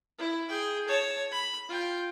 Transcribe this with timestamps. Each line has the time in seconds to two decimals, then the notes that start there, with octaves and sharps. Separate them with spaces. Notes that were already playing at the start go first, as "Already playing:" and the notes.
0.18 E4
0.49 G#4 G5
0.88 C#5 A5
1.31 B5
1.69 F4 G5